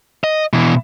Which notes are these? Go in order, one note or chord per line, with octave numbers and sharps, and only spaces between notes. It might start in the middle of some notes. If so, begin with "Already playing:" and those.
D#5
B2 E3